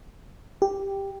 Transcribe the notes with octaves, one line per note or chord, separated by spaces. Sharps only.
G4